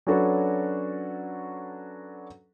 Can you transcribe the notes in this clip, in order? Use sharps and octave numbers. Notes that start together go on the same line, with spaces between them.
F#3 C#4 D4 F#4 A4 B4